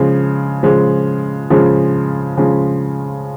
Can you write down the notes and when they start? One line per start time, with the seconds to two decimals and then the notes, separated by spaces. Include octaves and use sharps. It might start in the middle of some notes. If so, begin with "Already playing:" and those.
Already playing: C#3 F3 G#3
0.63 C#3 F3 G#3
1.50 C#3 F3 G#3
2.37 C#3 F3 G#3